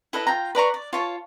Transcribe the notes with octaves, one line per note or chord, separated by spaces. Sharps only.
E4 A4 B4 D#5
F4 G5 A#5
B4 D5 A#5 C#6
D5
F4 C#5 A5